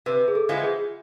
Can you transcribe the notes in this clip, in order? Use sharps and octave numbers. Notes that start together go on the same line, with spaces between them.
C3 B4
G#4
A4
F3 G#3 B3 E4
G#4